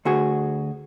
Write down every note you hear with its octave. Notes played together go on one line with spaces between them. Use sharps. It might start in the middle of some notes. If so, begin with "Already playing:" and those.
D2 F#4 G#4